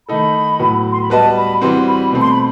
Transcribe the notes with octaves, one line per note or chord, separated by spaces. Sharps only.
D#3 A3 D#4 A4 B5
A2 F#3 B3 F#4 B4
C6
B5
G3 B3 F#4 B4 D#5 A5
B5
E3 G3 C4 F#4 C6
B5
B2 A3 C4
C6
B5